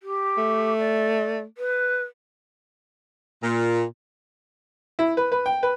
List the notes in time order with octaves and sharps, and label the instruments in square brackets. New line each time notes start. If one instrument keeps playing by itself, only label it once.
[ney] G4
[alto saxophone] A3
[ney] D5
B4
[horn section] A#2
[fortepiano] E4
B4
B4
G5
B4